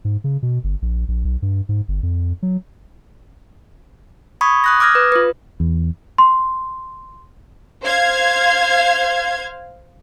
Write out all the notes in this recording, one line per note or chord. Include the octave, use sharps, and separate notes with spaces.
G#2
C#3
B2
G1
A#1
A#1
B1
G2
G#2
G1
F2
F#3
B5 C#6 D#6 G#6
D#6 F#6 A#6
D6 D#6 F6 G#6 A#6
B4
F4 B4
E2
C6
C5 F5 G#6